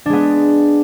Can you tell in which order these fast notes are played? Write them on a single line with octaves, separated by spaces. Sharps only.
D4 G#3 B3